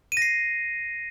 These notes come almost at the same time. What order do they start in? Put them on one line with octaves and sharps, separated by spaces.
D#7 A#6 C7